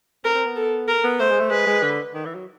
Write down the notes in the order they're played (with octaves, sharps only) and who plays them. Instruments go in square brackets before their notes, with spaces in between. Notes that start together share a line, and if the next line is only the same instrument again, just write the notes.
[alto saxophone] C4 [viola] A#4
[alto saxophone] C4
B3
[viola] A4
A#4
[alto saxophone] B3
[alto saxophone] A3 [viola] C5
[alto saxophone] G#3
A3
[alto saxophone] G#3 [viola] B4
[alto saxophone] G#3
D3
D#3
E3
F#3